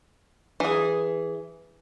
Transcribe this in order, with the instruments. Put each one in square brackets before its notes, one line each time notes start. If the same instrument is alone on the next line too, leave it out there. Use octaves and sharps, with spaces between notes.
[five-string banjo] E3 G#4